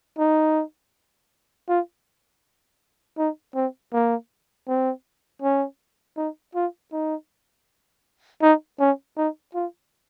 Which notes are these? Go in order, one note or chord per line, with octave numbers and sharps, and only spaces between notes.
D#4
F4
D#4
C4
A#3
C4
C#4
D#4
F4
D#4
D#4
C#4
D#4
F4